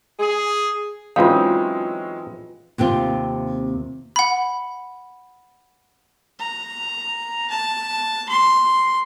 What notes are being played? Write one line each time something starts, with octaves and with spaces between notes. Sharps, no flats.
G#4
E3 F#3 G#3 C4 C#4 D#4 F4 F5
D#2 C3 C4 F4
F#5 B5
A#5
A5
C6